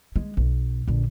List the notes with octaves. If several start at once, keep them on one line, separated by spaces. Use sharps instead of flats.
G#3
B1
A#1 D3